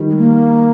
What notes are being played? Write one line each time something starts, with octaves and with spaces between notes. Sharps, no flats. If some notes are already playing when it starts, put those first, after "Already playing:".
Already playing: D#3 G3
G#3
A#3